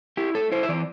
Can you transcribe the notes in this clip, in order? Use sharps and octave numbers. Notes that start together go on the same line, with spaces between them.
E4 G4
A3 A4
E4 C5
E5
E3 D5